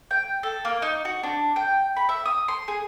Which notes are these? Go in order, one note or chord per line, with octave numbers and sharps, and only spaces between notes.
G5
A4
A#3
D#4
F#4
D4
G5
B5
E5
D#6
C6
G#4